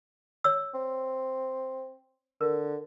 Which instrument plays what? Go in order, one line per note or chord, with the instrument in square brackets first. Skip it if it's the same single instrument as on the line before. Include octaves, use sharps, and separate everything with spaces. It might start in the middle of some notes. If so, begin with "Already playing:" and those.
[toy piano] C#5 E6
[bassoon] C4
[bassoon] D3 [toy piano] A#4